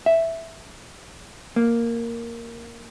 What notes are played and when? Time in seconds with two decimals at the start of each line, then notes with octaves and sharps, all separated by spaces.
0.06 E5
1.56 A#3